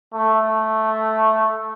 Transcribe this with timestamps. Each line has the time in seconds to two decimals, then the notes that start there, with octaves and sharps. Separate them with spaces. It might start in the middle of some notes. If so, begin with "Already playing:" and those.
0.14 A3